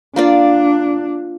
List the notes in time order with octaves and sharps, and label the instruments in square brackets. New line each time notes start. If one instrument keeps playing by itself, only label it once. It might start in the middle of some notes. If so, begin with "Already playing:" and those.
[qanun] A#3 F4 D5 [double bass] D4